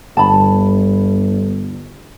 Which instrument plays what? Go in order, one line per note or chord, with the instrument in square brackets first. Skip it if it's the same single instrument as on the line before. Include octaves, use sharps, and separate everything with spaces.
[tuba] G1 [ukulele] A5 B5